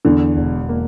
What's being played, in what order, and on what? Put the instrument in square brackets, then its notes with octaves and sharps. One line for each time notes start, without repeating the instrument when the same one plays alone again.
[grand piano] E2 [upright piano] D3
[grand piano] E1
A#3